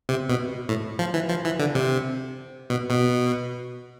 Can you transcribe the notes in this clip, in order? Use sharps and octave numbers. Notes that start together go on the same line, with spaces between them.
C3
B2
A2
F3
E3
F3
E3
D3
C3
B2
B2